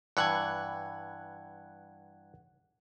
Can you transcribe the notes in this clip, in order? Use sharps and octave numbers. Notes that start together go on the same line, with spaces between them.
G2 E3 F#5 F#6 G#6